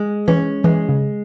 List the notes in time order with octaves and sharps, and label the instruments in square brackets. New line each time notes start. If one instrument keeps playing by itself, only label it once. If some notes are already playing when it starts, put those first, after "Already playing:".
Already playing: [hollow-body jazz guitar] G#3
[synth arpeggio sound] E3 [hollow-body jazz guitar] C#4
[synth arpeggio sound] E3 [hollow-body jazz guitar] G#3
[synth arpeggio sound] C#3